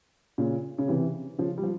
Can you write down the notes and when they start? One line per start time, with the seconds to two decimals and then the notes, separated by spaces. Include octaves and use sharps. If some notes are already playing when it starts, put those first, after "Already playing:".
0.38 A#2 C#3
0.78 C#3
0.88 C3 E3
1.38 C#3 F3
1.58 G3
1.63 F3